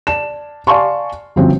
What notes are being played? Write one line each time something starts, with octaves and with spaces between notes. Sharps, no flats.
D5 A5 E7
D5 F5 G#5 A5 C6 C#6
G1 F3 C4 C#4 F#4